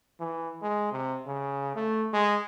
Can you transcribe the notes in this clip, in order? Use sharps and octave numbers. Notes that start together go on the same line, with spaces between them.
E3
G#3
C3
C#3
A3
G#3